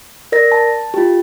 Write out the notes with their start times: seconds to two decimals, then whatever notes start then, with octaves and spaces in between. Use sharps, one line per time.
0.32 A#4 D5 A#6
0.52 A5
0.94 F4 G4